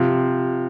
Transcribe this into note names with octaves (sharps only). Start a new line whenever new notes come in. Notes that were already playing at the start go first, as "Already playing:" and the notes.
Already playing: C3 F3